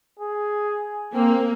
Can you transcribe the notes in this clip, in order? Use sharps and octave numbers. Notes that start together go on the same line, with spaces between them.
G#4
A#3 C4